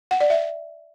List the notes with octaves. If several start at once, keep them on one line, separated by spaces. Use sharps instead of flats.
F#5
D5
E5